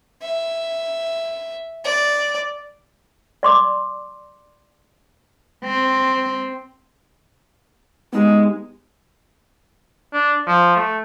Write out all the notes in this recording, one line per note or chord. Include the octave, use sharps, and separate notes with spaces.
E5
D5
D5 C6 D6
C4
G#3 B3 D#4 G4
D4
F3
A3